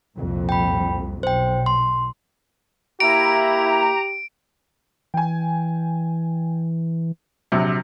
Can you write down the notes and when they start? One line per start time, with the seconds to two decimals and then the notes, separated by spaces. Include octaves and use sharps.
0.16 C2 F2 A#2
0.49 G5 B5
1.23 B1 C5 G5
1.66 C6
3.00 A#3 E4 G4 A#5 D7
5.14 E3 G5 G#5
7.52 A#1 C3 F#3